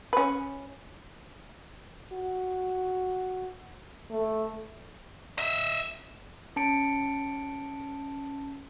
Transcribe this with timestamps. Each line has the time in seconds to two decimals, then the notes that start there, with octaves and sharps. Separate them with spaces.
0.13 C#4 B4
2.13 F#4
4.11 A3
5.38 D#5 E5
6.56 C#4 A5 C#7 D7